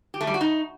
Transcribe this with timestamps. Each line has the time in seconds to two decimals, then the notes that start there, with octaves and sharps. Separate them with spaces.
0.14 G4
0.21 A3
0.27 G3
0.34 F#4
0.41 D#4